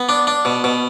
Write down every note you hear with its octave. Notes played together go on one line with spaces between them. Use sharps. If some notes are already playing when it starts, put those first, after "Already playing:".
Already playing: B3
D4
D4
B2
B2